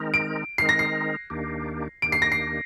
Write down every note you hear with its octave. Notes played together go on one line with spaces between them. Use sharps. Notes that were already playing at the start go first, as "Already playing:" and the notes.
Already playing: D#3 G#3 C4 D#4 A#4
D7
D#3 G#3 C4 D#4 A#4 C7
A#6
C7
D#2 D#3 A#3 D4 G4
D#2 D#3 A#3 D4 G4 D7
C7
A#6
C7